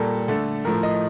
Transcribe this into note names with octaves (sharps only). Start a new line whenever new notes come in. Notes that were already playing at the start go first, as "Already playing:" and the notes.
Already playing: A#2 G3 A#3 A4
D3 A3 A4
A2 F3 A3 A#4
D#5